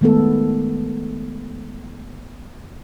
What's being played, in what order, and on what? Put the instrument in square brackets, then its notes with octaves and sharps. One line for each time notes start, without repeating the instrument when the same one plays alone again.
[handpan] D#3 G#3 A3 B3 A4